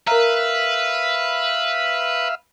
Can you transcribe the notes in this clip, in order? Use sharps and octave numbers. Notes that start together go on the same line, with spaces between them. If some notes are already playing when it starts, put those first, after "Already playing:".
A#4 B4 E5 F5 A#5